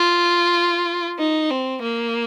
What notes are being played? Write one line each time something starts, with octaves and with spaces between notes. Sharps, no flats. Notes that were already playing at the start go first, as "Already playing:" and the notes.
Already playing: F4
D#4
C4
A#3